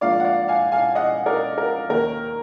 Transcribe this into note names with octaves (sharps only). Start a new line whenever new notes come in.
G#2 F3 A#3 D4 D5 F5
F#5
D5 F5
F5 G#5
F5 G#5
D#5 F#5
A#4 D5
A#4
D#2 D#3 A#3 D#4 A#4